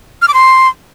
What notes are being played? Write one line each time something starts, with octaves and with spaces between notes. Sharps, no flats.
F6
D6
C6